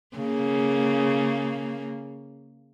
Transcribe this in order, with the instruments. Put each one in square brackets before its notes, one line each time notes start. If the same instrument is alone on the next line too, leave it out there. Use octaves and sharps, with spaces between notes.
[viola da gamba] C#3 A#3